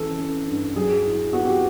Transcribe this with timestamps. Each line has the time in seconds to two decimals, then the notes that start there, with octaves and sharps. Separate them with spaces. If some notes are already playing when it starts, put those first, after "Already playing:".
Already playing: E3 C#4 A4
0.18 C#4
0.47 G2
0.75 F#3 G#4
1.04 E4
1.33 B3 F#4
1.44 G4